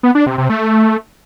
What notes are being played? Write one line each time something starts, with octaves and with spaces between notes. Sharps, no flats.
B3
D4
C3
C3
A3